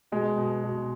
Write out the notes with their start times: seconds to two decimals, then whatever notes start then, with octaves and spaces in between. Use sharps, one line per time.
0.12 B2 G#3
0.38 B2
0.64 B2